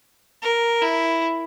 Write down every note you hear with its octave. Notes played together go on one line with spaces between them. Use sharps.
A#4
E4